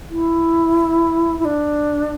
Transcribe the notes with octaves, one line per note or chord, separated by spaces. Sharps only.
E4
E4
D4